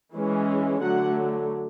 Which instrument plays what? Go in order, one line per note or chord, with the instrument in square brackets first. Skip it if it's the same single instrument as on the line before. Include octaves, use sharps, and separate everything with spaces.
[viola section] E3 G#3 C#4
D3 F#3 A3 F#5